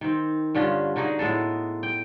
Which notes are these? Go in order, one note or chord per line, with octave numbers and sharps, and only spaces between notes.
D#3 C4
G2 D3 C#4 F4
D3 D#4 F#4 G#4
A2 G#3 B3 A4
G5